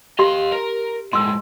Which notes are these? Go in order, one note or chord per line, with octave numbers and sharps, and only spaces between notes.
G4 D#5 F5 C6
A#4
A2 G#3 C6 E6